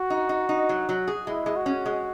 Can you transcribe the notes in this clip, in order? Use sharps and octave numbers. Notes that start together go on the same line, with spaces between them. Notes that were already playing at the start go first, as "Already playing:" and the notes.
Already playing: F#4
D#4
D#4
D#4
F#3
F#3
G#4
G#3 E4
G#3
F#4
C#4
G#3